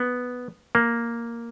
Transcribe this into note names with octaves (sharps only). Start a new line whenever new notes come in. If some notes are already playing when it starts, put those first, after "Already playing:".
Already playing: B3
A#3